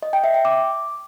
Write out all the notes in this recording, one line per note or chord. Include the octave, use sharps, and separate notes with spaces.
D#5
G5
E5
G5
D6